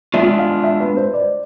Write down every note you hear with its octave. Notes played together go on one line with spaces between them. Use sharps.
G#3 B3 D4 F4 E5
F5
E5
B4
C5
D5